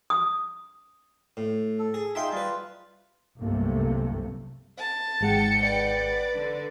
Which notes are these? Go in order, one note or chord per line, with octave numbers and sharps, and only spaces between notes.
D#6
A2
A4
G#4
D#4 F4 G#4 E5 G5 C6
G3 F4 B4
G1 C2 F#2 C3 A3 A#3
A5
G#1 G#2 G#3 F#5 G5 C#7
B4 D5
D3